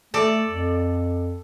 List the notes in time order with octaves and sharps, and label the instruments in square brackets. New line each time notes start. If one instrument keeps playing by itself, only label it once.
[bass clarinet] A3 [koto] A4 D5
[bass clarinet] F2